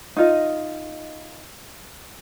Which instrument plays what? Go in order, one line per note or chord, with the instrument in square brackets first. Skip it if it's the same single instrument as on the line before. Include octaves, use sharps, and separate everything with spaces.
[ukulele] D#4 F4 D#5